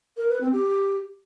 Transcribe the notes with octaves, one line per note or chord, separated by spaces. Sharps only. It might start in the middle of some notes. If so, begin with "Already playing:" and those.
A#4
B4
C4
G4